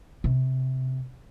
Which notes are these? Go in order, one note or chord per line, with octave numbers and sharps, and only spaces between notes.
C3